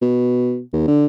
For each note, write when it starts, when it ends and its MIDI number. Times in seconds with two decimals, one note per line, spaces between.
0.01 0.60 47
0.73 0.85 39
0.87 1.06 50